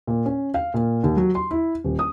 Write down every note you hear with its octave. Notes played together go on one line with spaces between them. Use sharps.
A#2
C#4
F5
A#2
D#2
F#3
C6
E4
D#1
D#6